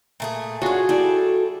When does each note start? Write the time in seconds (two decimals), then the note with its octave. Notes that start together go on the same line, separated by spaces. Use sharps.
0.20 A#2 A3 G#4
0.62 C#4 D4 F4 F#4 G#4
0.89 G3 E4 A4 D5